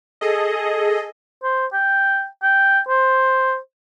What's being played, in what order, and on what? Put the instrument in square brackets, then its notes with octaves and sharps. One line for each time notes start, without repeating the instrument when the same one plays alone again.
[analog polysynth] G#4 A4 D#5
[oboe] C5
G5
G5
C5